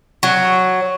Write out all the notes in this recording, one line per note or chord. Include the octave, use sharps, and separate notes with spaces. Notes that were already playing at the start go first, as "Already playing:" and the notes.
F#3